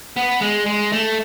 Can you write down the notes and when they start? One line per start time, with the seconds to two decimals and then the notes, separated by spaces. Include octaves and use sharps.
0.17 B3
0.42 G#3
0.66 G#3
0.92 A3